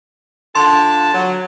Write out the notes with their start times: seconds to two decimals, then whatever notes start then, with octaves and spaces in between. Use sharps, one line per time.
0.55 D3 F4 A5 C6
1.13 F#3